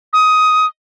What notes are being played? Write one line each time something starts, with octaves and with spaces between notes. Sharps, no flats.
D#6